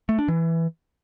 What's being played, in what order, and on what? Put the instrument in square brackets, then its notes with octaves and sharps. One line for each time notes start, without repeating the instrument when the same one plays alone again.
[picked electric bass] A3
D4
E3